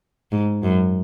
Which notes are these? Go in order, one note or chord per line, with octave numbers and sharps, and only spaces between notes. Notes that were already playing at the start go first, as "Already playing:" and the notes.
G#2
F#2